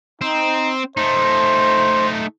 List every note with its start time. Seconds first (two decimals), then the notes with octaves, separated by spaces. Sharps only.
0.21 C4 D#4
0.97 A3 D#4 C5